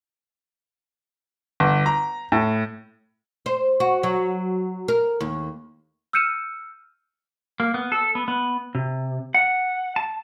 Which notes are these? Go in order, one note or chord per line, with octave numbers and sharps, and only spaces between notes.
G1
A#5
A2
C5
F#4
F#3
A#4
D#2
E6 F6 G6 C#7 D#7 E7
A#3
B3
A4
B3
B3
C3
F#5
A5